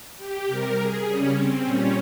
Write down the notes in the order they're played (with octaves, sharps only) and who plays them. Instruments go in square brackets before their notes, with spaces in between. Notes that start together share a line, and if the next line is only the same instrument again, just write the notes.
[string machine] G4
C3 G3 A#4
G#4
C#3 G3 C#4
C4
A#2 G3 C#4